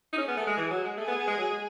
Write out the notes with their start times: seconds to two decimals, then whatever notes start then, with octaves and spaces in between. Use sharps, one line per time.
0.13 D#4
0.17 C#4 G#4
0.28 B3
0.37 A3
0.47 G#3
0.57 E3
0.70 F#3
0.84 G#3
0.97 A3 G#4
1.07 B3
1.18 B3
1.27 G#3
1.38 F#3
1.50 G#3